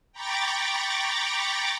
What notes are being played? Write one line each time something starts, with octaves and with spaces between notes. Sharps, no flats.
G5 A#5 B5 C#6 D6 A6